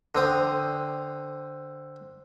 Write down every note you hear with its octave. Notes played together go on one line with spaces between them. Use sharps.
D3 C4 D#6